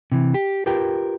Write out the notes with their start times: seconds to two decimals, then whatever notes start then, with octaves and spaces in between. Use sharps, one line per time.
0.12 C3 E3
0.34 G4
0.66 F4 G4 A#4 B4 G5